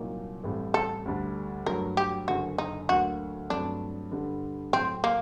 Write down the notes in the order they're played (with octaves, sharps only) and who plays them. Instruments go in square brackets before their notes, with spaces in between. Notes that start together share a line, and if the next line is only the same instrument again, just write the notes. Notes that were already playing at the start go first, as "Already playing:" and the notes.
Already playing: [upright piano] C2 A#2 F#3 A#3 D#4
A1 A2 G3 C4
[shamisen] A4
[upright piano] D2 D3 G3 D4
[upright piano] G2 F#3 A3 [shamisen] A#4
[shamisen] G4
[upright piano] F#1 F#2 D3 [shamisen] F#4
[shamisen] D#4
[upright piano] D2 D3 F#3 A#3 [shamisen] F#4
[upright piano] G2 F#3 A3 C4 [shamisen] D4
[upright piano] G2 D3 G3
[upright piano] A2 F#3 A3 [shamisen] C4
[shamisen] A#3